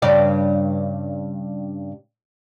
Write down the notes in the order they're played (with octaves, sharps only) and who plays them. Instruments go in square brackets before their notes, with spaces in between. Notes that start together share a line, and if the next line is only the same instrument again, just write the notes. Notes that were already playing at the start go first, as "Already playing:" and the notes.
[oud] G2 C#3 D5